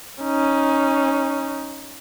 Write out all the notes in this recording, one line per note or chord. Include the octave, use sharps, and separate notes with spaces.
C#4 D#4